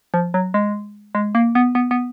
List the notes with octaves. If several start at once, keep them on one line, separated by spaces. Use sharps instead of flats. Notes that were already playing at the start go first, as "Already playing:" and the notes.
F3
F#3
G#3
G#3
A#3
B3
B3
B3